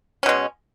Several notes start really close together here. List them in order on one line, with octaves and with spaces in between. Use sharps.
C#4 B2 G#3